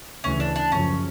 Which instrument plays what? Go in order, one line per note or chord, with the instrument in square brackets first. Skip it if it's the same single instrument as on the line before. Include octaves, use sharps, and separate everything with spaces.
[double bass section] D2 C#3 E3 [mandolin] C#4
[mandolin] D4
D4
[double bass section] F#2 C#3 F3 [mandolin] C#4